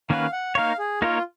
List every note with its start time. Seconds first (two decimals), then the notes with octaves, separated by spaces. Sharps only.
0.10 D#3 A#3 C#4 F#4 B4 F5
0.32 F#5
0.55 A#3 D#4 A#4 C#5 F5
0.78 G#4
1.02 A#3 D#4 F4 A#4 C#5